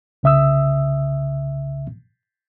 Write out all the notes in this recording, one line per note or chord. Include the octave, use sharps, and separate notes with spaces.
C2 C#3 E5 D#6 E6